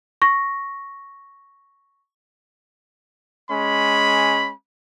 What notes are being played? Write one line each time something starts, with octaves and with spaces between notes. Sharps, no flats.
C#6 A#6
G#3 C#4 B5